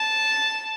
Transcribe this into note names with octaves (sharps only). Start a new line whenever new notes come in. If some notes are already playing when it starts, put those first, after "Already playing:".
Already playing: A5